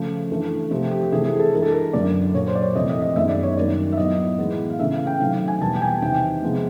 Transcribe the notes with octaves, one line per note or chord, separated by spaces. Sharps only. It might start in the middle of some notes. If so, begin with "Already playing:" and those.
Already playing: C#3 F3 A3
G2 E3 A3
C3 F3 A3 G4
G4
G4
C3 E3 A3 G#4
G#4
A4
G2 E3 G#3 A#4
A4
A#4
F#2 D3 F#3 D5
A#2 F#3 A#3 C#5
C5
D5
C#5
F2 C3 E3 A3 D#5
D#5
D#5
F#2 D#3 G#3 B3 E5
D5
C#5
F#2 D#3 G3 A#3 D5
E5
A2 F#3 B3 D#5
A2 E3 G#3 B3
F5
C#3 E3 A3 E5
F5
G5
C3 D#3 F#3 A3 F5
G#5
E2 B2 G3 A#3 A5
G5
G#5
E2 C3 D#3 G5
C3 F3 G#3 B3